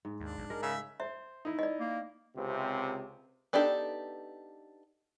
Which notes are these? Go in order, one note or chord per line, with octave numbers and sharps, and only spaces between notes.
G#2
D#2 D4
B1
G#3 A#4
C#3 E5
C5 E5
D#4 E4
D5 D#5
A#3
C#2 C3
B3 D4 D#4 G4 A4